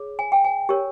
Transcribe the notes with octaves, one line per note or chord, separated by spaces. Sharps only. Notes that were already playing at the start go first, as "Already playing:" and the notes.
Already playing: G#4 C#5
G#5
G5
G#5
G4 A#4 C#5